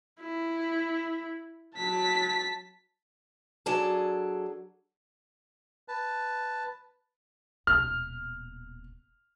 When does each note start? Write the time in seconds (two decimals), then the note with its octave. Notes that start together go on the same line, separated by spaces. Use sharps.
0.20 E4
1.77 F#3 A5 B6
3.66 F#3 D4 G#4 A4
5.88 B4 A5
7.67 D#1 B2 F6